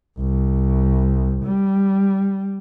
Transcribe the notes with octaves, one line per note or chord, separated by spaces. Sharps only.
C2
G3